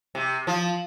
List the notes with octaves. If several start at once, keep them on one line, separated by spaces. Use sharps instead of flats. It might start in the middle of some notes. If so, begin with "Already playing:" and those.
C3
F3